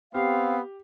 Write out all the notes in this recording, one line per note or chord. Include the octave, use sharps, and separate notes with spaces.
B3 C4 G4 F5